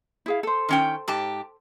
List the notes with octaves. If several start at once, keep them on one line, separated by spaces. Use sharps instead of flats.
E4 G#4 F5
A4 C5
D#3 C#4 G5
G#2 G4 A5